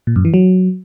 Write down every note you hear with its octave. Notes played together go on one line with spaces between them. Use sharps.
A#2
F#2
E3
F#3